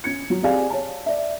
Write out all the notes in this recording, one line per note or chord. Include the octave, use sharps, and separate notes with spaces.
C#4 G#6 C#7
F#3
C4 G4 G#4 D5 F5 G#5
C#5 A5
D5 E5